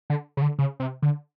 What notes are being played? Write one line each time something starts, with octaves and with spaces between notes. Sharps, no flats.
D3
C#3
D3
C#3
C3
D3